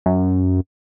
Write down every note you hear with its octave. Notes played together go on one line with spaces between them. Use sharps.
F#2